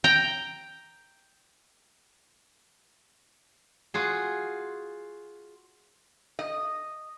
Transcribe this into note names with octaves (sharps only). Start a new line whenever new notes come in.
G5 A#5
F4 F#4 G#4
D#5